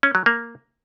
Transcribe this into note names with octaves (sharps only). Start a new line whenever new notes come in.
C#4
F#3
A#3